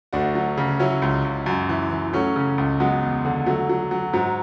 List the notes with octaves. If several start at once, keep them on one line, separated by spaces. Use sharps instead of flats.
D2 D4 F#4
F#3
C#3
F#3 C#4 E4
C#2
C#2
F#2
E3
E3
F#3 A3 C#4
C#3
C#2
F#3 G#3 B3
E2
D3
F#3 A3
F#3
F#3
G#2 F#3